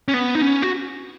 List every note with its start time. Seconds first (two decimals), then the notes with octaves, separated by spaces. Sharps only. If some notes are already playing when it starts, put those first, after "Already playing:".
0.08 C#4
0.14 B3
0.35 D#4
0.41 C#4
0.62 F#4